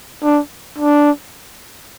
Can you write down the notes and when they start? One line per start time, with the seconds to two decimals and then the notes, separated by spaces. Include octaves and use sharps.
0.24 D4
0.78 D4